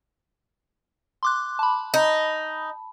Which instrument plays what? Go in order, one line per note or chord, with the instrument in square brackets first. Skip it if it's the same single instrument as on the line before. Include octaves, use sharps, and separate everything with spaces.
[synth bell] C6 D6 F#6
A5 B5
[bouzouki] D#4